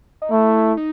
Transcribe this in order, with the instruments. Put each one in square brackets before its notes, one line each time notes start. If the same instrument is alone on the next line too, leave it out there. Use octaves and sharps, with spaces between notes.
[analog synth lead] D#4
[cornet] A3 [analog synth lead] E4
[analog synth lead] D#4